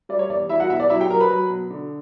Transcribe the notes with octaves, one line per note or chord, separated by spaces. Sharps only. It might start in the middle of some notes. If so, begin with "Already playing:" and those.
G3 D5
C#5
E2 D5
G3 E4 E5
F#4 F#5
B2 E4 E5
D5
F#3 E4 E5
G4 G5
F#3 A#4 A#5
B4 B5
F#3
B2
D3